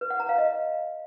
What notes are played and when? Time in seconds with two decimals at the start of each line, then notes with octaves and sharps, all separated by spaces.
0.01 B4
0.10 F#5
0.20 A#5
0.29 F5
0.38 D#5